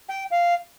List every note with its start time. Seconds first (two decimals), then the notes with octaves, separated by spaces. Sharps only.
0.09 G5
0.31 F5